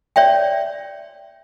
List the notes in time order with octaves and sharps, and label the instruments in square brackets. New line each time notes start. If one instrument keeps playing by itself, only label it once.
[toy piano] C#5 D5 E5 G5